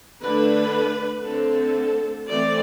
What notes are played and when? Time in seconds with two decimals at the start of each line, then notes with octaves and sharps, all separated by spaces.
0.21 D3 A3 D4 B4
1.24 D3 A3 C4 A4
2.27 E3 A3 C4 D5